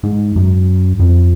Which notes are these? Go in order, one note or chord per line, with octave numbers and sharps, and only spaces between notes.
G#2
F#2
F2